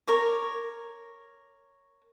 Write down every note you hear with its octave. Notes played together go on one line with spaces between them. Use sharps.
A#4 C#5 D6